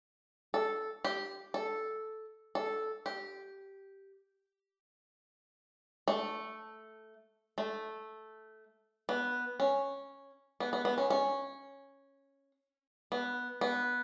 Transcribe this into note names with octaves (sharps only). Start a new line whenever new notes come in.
A4
G4
A4
A4
G4
A3
A3
B3
C#4
B3
B3
B3
C#4
C#4
B3
B3